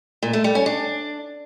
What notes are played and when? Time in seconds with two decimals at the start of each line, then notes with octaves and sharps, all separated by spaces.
0.23 A#2
0.33 A3
0.44 G3
0.55 C#4
0.66 D4